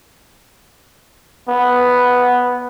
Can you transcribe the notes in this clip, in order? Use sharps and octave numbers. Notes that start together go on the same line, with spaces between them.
B3